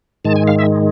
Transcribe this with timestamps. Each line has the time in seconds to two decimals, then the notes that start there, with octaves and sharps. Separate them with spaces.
0.25 G#2 D#3 G#3 A5
0.36 G#5
0.48 F5
0.59 E5